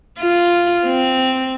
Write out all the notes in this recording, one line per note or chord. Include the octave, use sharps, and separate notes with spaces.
F4
C4